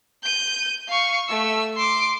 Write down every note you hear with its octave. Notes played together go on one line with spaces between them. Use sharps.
G6 D#7
F5 C#6
A3 E6
C6 D6